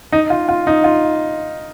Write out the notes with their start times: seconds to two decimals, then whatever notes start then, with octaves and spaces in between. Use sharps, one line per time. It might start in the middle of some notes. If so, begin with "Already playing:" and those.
0.13 D#4
0.30 F4
0.49 F4
0.67 D#4
0.84 F4